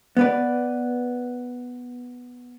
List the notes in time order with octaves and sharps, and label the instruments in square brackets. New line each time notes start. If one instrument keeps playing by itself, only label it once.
[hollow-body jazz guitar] B3 B4 D5